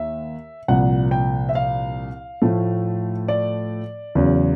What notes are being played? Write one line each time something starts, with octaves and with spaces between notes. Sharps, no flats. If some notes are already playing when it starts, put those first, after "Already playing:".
Already playing: D#2 E5
C2 A#2 F3 F#5
G5
E5
F5
A2 F3 A3
D5
E2 C#3 F#3